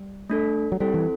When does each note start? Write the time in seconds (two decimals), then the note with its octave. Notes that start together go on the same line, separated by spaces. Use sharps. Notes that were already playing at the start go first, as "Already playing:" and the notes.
Already playing: G3
0.30 A3 D4 A4
0.72 F#3
0.80 G3 C4 E4 A4 C5
0.94 E3